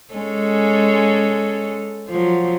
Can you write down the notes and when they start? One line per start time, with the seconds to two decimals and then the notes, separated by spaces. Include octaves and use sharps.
0.14 G#3 C#4 A4
2.09 F3 F#3